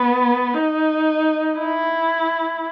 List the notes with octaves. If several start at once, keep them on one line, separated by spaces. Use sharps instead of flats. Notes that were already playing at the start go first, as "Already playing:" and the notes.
Already playing: B3
D#4
E4